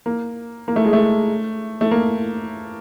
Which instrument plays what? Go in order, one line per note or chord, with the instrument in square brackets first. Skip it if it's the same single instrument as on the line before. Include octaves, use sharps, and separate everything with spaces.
[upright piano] A#3
A#3
A3
G#3
A3
A3
A#3